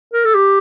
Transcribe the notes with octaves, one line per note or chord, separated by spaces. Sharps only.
A#4
A4
G4